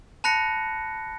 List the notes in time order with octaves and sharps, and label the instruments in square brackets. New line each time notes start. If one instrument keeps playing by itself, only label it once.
[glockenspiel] A5 B5 F#6 A#6 C#7